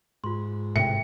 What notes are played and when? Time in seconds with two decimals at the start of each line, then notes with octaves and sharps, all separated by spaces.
0.24 G#2 F4 C6
0.76 A2 C3 E5 G5 C#7